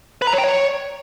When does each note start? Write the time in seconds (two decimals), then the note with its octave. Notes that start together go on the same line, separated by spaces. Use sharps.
0.22 B4
0.27 A#5
0.33 C#5
0.38 G5
0.44 C#5